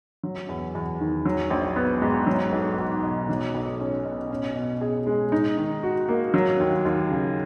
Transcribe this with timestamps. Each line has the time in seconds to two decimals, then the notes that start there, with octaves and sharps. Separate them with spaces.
0.24 F#3
0.49 E2
0.75 E2
1.00 D#3
1.26 F#3
1.50 A#1
1.76 B3
2.02 G#2
2.27 F#3
2.52 B1
2.78 B1
3.03 B2
3.29 F#3
3.55 B1
3.80 C#4
4.05 B2
4.30 C#4
4.55 B2
4.81 G#4
5.07 G#3
5.32 D#4
5.57 D#3
5.83 F#4
6.09 A#3
6.34 F#3
6.60 D#2
6.85 D#2
7.11 C#3